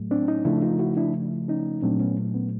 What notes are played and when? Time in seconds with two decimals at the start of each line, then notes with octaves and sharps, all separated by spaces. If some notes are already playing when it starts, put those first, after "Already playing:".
Already playing: A2 F#3 A3
0.11 C4 D4
0.28 C#4 D#4
0.45 C#3 F3 A3 D4 E4
0.62 D#4 F4
0.79 E4 F#4
0.97 D4 E4
1.48 C#4 D#4
1.82 A#2 F#3 A3 C4 D4
2.00 B3 C#4
2.34 B3